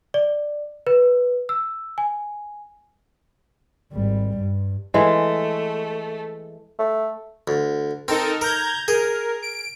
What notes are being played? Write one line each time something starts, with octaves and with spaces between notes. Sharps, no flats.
D5
B4
E6
G#5
G#1 G3
G2
E3 G#3 A3
A3
D2
C4 D#4 A4 A#4
A#4 A#5 G6 G#6
G#4 A#4
D7